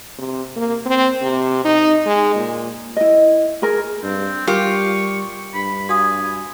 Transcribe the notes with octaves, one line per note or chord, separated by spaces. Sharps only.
C3
A#3
C4
C3
D#4
G#3
A#2
E4 D#5
G#4 A#4
G2 C4
G3 F4 G4 A#4 C#6
G2 B5
F#4 F5 G#5 D#6